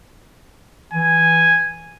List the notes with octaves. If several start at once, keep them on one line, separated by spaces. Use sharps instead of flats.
E3 G#5